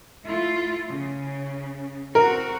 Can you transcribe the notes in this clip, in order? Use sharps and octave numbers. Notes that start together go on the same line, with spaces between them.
A3 E4 F4
C#3
C4 F#4 A#4